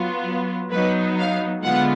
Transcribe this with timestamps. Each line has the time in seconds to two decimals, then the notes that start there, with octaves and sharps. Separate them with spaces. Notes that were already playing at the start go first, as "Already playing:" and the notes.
Already playing: F#3 B3 F4
0.71 F#3 B3 D#4 B4
1.18 F5
1.63 D3 G#3 B3 F4 F#5